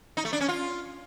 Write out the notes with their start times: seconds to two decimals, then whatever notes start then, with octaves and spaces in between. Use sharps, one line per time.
0.17 D#4
0.25 A3
0.33 D4
0.41 C#4
0.48 F4